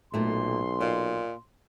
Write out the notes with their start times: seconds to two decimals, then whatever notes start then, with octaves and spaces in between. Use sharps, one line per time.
0.14 B1 A#2 A3 C6
0.81 A#2 D#5